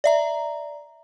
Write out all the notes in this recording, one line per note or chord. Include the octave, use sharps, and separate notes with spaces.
D5 E5 A#5